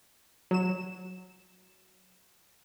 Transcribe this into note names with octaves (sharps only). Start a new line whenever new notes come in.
F#3 E7